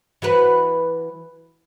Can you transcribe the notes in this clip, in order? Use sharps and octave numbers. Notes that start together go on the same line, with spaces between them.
E3 F#4 B4